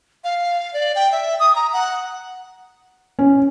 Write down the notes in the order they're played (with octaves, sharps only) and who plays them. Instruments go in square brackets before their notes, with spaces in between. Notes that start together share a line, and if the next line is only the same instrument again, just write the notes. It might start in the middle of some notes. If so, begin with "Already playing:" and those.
[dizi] F5
D5
G5
E5
D#6
A#5
F#5
[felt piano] C#4